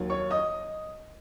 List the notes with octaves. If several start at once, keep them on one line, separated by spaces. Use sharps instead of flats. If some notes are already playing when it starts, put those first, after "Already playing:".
Already playing: D#2 D#3 F#3
C#5 C#6
D#5 D#6